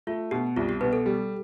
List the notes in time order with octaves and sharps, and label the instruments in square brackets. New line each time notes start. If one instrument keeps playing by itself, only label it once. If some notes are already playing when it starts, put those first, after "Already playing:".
[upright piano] A3 [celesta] F4
[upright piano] B2 [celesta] G4
[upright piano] C2 [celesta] F4
[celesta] G4
[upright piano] B2 [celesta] B4
[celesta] A4
[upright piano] G3